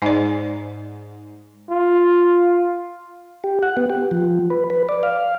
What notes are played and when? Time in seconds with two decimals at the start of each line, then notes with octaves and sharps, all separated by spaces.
0.02 G#2 D#4 D5
1.70 F4
3.44 G4
3.63 F#5
3.77 B3
3.90 G4
4.11 F3
4.50 B4
4.70 B4
4.89 D5
5.03 F5